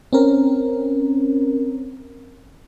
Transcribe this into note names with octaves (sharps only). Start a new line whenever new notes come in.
C4 C#4 A#4